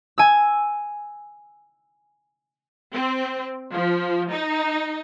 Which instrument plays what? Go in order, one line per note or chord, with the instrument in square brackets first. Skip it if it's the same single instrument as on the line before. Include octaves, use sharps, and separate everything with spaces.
[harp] G#5 E6
[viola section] C4
F3
D#4